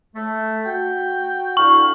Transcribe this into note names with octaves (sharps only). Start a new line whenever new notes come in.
A3
F#4 G5
D3 E4 F5 C#6